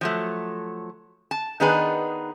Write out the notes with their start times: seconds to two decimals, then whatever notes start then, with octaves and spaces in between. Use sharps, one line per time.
0.01 F3 F#3 A3
1.31 A5
1.60 D#3 B3 D4 D#4 G#4 B4